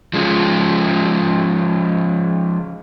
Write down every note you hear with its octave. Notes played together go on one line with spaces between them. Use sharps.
F3 G#3 C#4